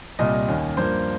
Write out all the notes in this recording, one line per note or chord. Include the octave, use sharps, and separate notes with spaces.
C2 A#2 G3 D#5
D#2 D#3 A#3 C#4
G2 F3 A#3 C5